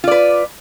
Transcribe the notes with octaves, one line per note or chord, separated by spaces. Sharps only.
F4 B4 D5